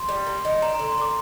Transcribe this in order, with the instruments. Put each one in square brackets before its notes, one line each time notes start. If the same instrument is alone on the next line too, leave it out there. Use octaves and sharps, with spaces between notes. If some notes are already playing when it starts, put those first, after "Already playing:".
Already playing: [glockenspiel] C6
[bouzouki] G3
A#3
D#3
[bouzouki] D4 [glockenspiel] A#5
[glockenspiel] A#5
[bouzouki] D3
[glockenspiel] C6
[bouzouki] D3 [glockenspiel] D6